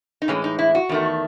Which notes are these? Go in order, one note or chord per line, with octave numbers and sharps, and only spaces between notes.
D#4
A2 E3 G#3 C#4
D#4
E4
F#4
E2 D#3 A3